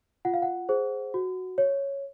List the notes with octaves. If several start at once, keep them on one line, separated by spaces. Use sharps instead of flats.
F4 F#5
F5
F#5
G#4 C5
F#4
C#5